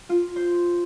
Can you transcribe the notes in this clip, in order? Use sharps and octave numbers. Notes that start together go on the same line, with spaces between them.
F4
C5